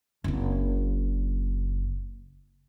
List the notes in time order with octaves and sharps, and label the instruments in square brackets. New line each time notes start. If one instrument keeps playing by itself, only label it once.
[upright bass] F#1 C4